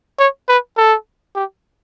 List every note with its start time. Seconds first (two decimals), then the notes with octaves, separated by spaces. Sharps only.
0.19 C#5
0.49 B4
0.77 A4
1.35 G4